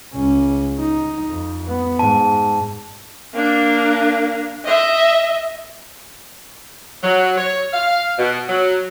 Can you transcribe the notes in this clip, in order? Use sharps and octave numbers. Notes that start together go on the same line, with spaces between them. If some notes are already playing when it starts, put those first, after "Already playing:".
C#2 C#4
D#4
F2
B3
G#2 A5
A#3 D4
D#5 E5
F#3
C#5
F5
B2
F#3